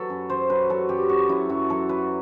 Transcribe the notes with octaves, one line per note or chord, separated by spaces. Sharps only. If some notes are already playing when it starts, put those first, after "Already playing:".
Already playing: F#3 A4 B4
F#2
F#2 C5
F#3 B4
F#3 A4
F#2 G4
F#2 F#4
F#2 E4
F#2 F#4
F#3 A4
F#3 B4